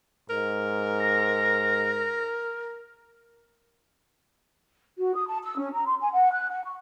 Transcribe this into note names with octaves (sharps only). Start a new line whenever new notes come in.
G#2 A#4
A#6
F#4
D#6
A5
E6
C#4
A#5
C6
G#5
F#5
F#6
F#5
C#6